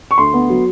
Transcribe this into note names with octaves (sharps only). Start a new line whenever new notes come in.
C#6
D2 C6
B3
F#3